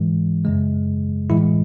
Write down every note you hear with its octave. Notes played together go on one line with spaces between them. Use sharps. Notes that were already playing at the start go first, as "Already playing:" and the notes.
Already playing: G#2 E3 G#3
F#2 C#3 G#3
A2 E3 G#3 E4